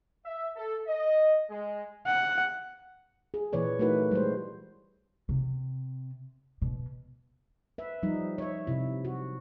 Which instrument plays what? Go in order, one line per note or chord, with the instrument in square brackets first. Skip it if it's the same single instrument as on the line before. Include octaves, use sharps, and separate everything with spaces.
[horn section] E5
A4
D#5
G#3
[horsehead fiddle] F#5
[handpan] G#4
A#2 E3 B4 C#5 D5
A3 D#4 E4 F#4 A#4 B4
G3 G#3 C5
[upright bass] C3
B2
[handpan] B4 E5
F3 G3 D#4
C#5 E5
C3 E4
F#4